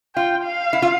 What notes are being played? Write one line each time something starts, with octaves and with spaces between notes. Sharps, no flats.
F4 G5
F5
E4
F4